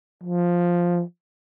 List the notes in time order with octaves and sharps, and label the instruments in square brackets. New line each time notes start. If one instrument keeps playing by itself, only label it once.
[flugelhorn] F3